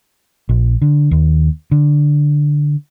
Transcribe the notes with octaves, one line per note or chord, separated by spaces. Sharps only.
A#1
D3
D#2
D3